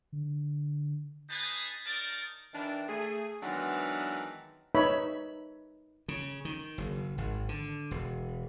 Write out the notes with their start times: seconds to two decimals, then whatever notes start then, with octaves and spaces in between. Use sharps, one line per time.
0.12 D3
1.30 D#4 G#4 B4 A5
1.85 D#4 A#4 D5 A5
2.54 D#3 E3 D4
2.88 A3 G#4
3.42 D#3 E3 F#3 G#3 B3 D4
4.75 D#4 B4 C#5 E5 B5
6.08 C#3
6.45 D#3
6.78 F#1
7.18 G#1
7.49 D3
7.91 E1